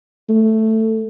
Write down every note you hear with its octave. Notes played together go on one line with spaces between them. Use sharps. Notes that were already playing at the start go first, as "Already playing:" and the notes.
A3